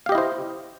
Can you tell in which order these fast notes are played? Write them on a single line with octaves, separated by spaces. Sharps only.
F5 G4 D#5 E4 C5